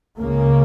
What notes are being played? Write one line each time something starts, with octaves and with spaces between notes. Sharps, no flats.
C#2 C#3 A#3